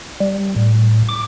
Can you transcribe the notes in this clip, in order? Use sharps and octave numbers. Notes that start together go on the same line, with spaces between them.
G3
A2
D6